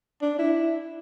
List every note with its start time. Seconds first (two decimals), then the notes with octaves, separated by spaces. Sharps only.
0.22 D4
0.39 E4